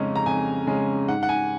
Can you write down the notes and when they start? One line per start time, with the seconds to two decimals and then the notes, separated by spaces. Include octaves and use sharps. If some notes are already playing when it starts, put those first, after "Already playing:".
Already playing: F2 C#3 G#3 C#4 A#5
0.16 A#5
0.26 F2 G#5
0.67 C#3 G#3 C#4
1.08 G#2 F#5
1.23 F#5
1.29 G#5